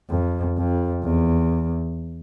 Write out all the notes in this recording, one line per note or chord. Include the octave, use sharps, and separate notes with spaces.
F2
F2
E2